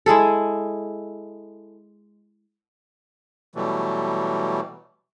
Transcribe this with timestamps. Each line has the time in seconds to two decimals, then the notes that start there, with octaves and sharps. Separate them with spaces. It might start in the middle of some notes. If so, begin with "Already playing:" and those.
0.06 G#3 E4 G#4 A4
3.55 B2 E3 F#3 G3 A3